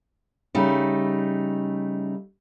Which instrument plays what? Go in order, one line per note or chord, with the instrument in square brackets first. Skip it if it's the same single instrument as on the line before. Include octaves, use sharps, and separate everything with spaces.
[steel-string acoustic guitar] C#3 G3 A3 D#4